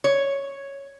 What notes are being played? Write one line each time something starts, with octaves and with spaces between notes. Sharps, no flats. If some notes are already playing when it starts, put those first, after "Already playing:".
C#5